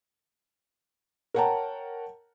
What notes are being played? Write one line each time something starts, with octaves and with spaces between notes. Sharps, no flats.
A#4 C#5 F#5 G5 A5 A#5